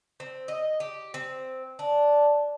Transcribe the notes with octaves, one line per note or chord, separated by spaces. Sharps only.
C4
D#5
G4
C4
D4